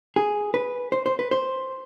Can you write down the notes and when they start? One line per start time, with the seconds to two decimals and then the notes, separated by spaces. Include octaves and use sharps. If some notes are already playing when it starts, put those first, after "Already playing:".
0.16 G#4
0.54 B4
0.92 C5
1.06 C5
1.19 B4
1.31 C5